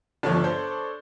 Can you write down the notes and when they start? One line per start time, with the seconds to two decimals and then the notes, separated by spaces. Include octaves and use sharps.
0.23 G1 F3 D4 A4 C#5
0.44 C5 G6